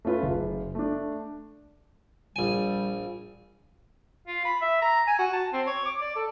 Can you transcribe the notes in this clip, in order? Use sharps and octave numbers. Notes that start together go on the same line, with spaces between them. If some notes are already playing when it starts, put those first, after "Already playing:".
A3 C#4 F4 B4
F#1
A3 D4
A#1 G3 G#5
F4
B5
E5
A#5
G#5
F#4
A5
C4
C#5
D6
D5
A4